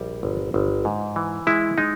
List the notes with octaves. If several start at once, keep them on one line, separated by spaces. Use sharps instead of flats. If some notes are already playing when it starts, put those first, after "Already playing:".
Already playing: A#1 G3
G1
G1
G#2
E3
G#3 E4
G#3 D#4